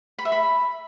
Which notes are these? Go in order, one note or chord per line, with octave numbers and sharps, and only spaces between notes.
B5
E5
B5